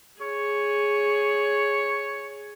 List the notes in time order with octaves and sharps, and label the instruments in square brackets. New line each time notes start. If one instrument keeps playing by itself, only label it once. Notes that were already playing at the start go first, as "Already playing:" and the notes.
[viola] G#4 [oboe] C#5